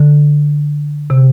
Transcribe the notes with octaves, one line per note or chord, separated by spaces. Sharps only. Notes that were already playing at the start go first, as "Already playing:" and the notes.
Already playing: D3
C3